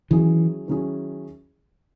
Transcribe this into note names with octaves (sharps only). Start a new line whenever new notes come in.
D#3 E3 F#3 C#4 E4 G#4
D#3 F#3 C#4 E4 G#4